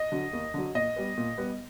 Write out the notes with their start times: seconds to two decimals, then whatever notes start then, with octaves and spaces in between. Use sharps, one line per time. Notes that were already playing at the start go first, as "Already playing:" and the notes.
Already playing: D#5
0.12 D3 F#3
0.33 D#2
0.54 D3 F#3
0.75 A#2 D#5
0.96 G3 B3
1.17 A#2
1.38 G3 B3